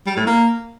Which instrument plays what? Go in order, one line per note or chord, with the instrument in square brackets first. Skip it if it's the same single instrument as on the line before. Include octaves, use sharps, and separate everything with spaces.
[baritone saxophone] G3
A2
A#3